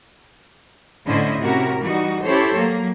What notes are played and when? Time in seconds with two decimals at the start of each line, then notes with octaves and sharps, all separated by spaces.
1.06 A2 D3 C#4 E4 C5 D#5
1.40 C3 C#4 E4 F#4 A#4
1.82 E3 G3 D#4 F#4
2.24 C#4 E4 G4 A4 C5 C#5
2.54 F#3 A#3